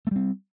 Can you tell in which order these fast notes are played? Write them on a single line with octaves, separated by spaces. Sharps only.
A3 G3 C4